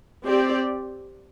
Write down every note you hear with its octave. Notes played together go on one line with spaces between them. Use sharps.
C4 G4 D5